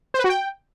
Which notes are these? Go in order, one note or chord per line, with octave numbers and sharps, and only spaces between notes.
C5
B4
F#4
G5